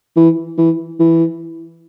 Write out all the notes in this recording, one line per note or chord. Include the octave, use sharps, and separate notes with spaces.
E3
E3
E3